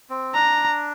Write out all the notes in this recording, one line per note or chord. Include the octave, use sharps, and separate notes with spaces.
C4
D4 A#5